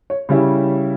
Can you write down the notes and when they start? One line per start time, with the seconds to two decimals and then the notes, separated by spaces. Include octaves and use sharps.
0.10 C#5
0.29 C#3 G3 C#4 E4